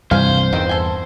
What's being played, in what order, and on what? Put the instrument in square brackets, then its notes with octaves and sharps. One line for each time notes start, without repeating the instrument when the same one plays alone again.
[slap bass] C2 [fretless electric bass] G2 E3 [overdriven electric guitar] C5 [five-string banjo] F5 G#5
[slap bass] E2 [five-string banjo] D#3 C4
[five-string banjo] A4 G#5